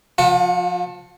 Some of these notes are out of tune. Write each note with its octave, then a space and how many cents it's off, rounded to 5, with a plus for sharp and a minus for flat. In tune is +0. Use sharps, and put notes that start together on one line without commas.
F3 +15 F4 +45 F#5 +0